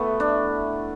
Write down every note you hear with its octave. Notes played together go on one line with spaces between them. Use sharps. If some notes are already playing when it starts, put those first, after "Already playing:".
Already playing: A3 B3 E4 F#4
D4